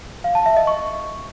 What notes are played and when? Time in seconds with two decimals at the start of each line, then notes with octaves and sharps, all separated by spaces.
0.24 F5
0.35 A5
0.46 E5
0.57 D#5
0.67 C#6